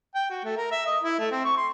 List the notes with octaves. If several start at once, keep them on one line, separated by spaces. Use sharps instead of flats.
G5
F#4
A3
A#4
E5
D#5
E4
A3
C4
C#6
C6